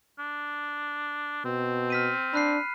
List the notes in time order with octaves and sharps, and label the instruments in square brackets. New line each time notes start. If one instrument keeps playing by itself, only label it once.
[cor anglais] D4
[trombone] B2 [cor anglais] C4
[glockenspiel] F6 B6 D#7
[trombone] D4 [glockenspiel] B5 F#6 C7